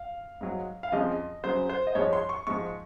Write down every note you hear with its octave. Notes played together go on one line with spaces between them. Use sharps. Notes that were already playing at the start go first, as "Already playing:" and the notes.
Already playing: F5
G#2 F#3
F5
F2 C#3 F3 G#3 D#5
F#2 C#3 F#3 C5
C5
D#5
G#2 F3 G#3 C#5
C6
C#6
G#2 F3 G#3 C#6